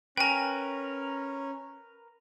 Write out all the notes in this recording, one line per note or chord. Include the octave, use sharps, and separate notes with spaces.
C#4 A#4 B4 G5 G#5